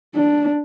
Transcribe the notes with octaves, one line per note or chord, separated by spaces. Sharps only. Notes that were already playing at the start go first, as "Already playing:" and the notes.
D4